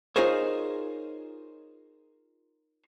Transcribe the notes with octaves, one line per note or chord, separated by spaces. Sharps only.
D#4 F4 G#4 A#4 C5 C#5